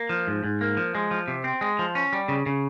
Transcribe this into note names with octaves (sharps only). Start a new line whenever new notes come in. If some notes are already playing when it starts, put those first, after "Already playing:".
Already playing: A#3
F3
G#2
G#2
A#3
F3
G#3
F3
C3
C4
G#3
F3
C#4
G3
C#3
C#3